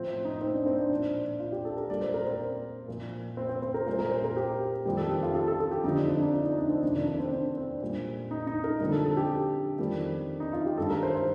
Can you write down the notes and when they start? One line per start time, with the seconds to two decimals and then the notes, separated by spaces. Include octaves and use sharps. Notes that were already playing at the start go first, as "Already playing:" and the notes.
Already playing: A2 F3 C4
0.25 D#4
0.41 C4
0.54 D4
0.66 C4
0.79 D4
0.90 A#2 F3
1.40 F4
1.52 G4
1.65 A4
1.77 A#4
1.89 A#2 G3 D5
2.01 C5
2.14 A#4
2.27 C4
2.88 A#2 F3
3.37 C4
3.49 C4
3.62 C4
3.74 A#4
3.86 A#2 G3 C5
3.99 A#4
4.11 C5
4.24 A#4
4.37 G4
4.85 F2 D#3 G3 G4
4.97 A4
5.11 G4
5.23 F4
5.35 A4
5.48 A4
5.60 A4
5.71 G4
5.84 F2 D3 F3 D#4
5.97 D4
6.09 D4
6.21 D#4
6.33 F4
6.46 D#4
6.58 D4
6.70 C4
6.82 F2 C3 D#3 D4
6.95 D4
7.07 D4
7.20 C4
7.32 D4
7.57 C4
7.82 A#2 G3
8.31 D#4
8.47 D#4
8.64 A#4
8.80 F2 D3 G3
8.92 A4
9.04 A4
9.17 G4
9.79 F2 D#3 G3
10.40 D#4
10.53 F4
10.66 G4
10.77 G2 D#3 G3 A4
10.90 A#4
11.03 C5
11.15 C5